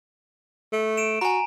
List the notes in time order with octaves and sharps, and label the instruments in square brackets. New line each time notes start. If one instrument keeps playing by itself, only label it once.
[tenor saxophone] A3
[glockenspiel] D7 E7
[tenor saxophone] F#4 [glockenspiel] G#5 A#5